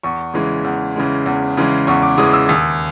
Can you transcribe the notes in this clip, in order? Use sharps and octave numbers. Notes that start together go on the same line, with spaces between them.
E2 C#6
C#3 E3 G#3
E2
C#3 E3 G#3
E2
C#3 E3 G#3
E2 C#6
D6
C#3 E3 G#3 D#6
E6
D#2 D#6